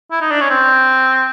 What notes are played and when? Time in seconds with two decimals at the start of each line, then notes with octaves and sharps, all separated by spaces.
0.11 E4
0.21 D#4
0.31 D4
0.40 C#4
0.50 C4